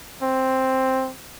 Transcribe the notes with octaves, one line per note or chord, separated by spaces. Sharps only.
C4